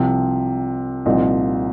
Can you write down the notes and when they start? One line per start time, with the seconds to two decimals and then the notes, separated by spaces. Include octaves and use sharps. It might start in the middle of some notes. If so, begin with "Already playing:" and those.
Already playing: C2 C3 F3
1.06 C2 A#2 F3 C4 D#4